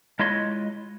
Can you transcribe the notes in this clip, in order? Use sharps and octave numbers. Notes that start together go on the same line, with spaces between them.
G#3 E4 F4 C#5 D#5 C6